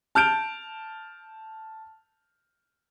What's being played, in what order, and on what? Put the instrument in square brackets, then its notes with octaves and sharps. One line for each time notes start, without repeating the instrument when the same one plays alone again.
[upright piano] A5 F6 G6 D7